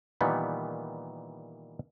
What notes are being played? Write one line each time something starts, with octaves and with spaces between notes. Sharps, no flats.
A#2 D#3 E3 G3 B3